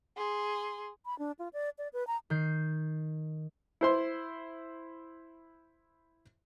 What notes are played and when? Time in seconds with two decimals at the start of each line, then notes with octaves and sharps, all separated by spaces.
0.17 G#4 C6
1.06 B5
1.19 D4
1.39 F4
1.53 D5
1.78 D5
1.93 B4
2.07 A#5
2.30 D#3 G6 C7
3.81 E4 C5 C6